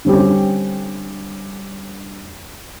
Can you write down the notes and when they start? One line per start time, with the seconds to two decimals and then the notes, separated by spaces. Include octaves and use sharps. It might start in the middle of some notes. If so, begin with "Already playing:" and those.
0.05 D3 G3 C4 C#4 G4